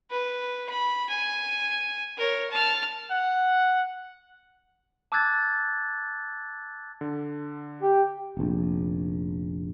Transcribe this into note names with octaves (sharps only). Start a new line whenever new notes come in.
B4
B5
G#5
A#4 C#5
A5 F6
F#5
A5 D6 E6 F#6 G#6 A6
D3
G4 G5
F1 A#1